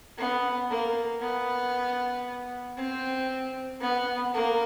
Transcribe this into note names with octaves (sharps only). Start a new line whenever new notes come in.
B3
A#3
B3
C4
B3
A#3